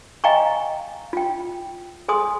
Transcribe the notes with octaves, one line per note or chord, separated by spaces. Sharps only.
D#5 F5 G5 G#5 A#5 C#6
F4 G5
G#4 A4 G#5 C6 D#6